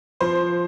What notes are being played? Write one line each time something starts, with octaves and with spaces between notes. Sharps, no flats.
F3 C5